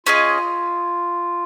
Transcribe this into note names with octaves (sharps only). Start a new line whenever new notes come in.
C#4 F4 G#4 D#5